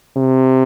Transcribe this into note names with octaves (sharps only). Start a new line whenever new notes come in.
C3